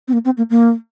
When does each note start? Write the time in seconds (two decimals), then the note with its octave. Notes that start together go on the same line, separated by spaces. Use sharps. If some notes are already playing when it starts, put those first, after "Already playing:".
0.08 C4
0.13 A#3
0.25 C4
0.37 A#3
0.50 A#3